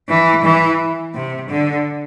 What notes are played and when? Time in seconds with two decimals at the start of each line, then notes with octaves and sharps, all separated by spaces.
0.09 E3
0.44 E3
1.15 C3
1.49 D3